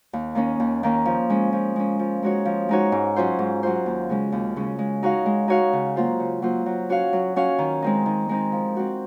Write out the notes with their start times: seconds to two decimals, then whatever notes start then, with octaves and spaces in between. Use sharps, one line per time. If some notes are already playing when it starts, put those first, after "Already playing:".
0.13 D#2
0.35 D#3 A#3 C#4
0.60 D#2
0.83 D#3 A#3 C#4
1.06 F3
1.30 G#3 C#4
1.53 F3
1.76 G#3 C#4
1.99 F3
2.23 G#3 D#4 F#4 C#5
2.45 F3
2.69 G#3 D#4 F#4 C#5
2.92 G#2
3.16 F#3 C#4 F4 C5
3.39 G#2
3.63 F#3 C#4 F4 C5
3.86 D#2
4.09 C#3 G#3 C#4
4.32 D#2
4.56 C#3 G#3 C#4
4.79 G#3
5.03 D#4 F#4 C#5 F5
5.26 G#3
5.48 D#4 F#4 C#5 F5
5.73 C#3
5.96 F#3 A#3 F4 C5
6.20 C#3
6.42 F#3 A#3 F4 C5
6.66 F#3
6.89 C#4 F#4 C#5 F5
7.13 F#3
7.36 C#4 F#4 C#5 F5
7.59 D#3
7.82 G#3 C4 D#4
8.06 D#3
8.29 G#3 C4 D#4
8.52 F3
8.76 C4 F#4